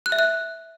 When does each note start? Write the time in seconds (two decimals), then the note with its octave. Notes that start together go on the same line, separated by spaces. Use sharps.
0.06 F#6
0.12 E5
0.19 F#6